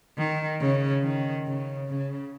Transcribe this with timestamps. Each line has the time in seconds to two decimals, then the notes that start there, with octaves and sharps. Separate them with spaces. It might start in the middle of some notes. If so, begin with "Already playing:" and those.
0.18 D#3
0.60 C#3
1.03 D#3
1.46 C#3
1.89 C#3